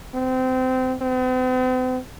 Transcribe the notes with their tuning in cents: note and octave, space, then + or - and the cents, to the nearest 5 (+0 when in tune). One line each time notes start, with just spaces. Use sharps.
C4 -25
C4 -45